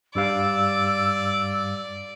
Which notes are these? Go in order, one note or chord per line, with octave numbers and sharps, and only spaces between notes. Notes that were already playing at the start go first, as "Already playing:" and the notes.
G2 G3 D5 F5 E6